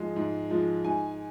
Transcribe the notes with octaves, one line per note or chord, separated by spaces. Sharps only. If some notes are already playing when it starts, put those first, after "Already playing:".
Already playing: G#2 F3 G#3
G#2
F3 G#3
G#2 G#5